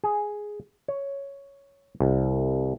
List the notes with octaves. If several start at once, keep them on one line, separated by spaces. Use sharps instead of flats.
G#4
C#5
C2